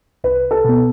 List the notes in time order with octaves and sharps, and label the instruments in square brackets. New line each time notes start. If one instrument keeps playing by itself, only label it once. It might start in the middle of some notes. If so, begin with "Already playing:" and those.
[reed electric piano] C2 [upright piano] B4
[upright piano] A4
[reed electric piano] B2 B3